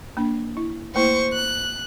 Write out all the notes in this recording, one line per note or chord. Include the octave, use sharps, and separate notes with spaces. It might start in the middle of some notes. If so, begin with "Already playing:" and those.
A#3 D4
E4
A3 A#3 E4 C5 C#6
F#6